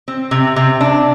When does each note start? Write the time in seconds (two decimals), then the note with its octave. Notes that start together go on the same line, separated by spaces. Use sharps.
0.08 C4
0.31 C3
0.56 C3
0.81 D4